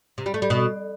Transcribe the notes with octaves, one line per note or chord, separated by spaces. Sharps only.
C3
G3
A3
G3
B2